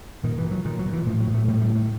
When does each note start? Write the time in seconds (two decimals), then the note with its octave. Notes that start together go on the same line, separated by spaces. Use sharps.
0.24 A#2 D#3
0.38 E3
0.44 A#2
0.51 F#3
0.65 A#2 D#3
0.79 F#3
0.86 A#2
0.93 E3
1.06 A2 F3
1.20 F#3
1.28 A2
1.34 A3
1.48 A2 G3
1.62 G3
1.69 A2
1.75 A3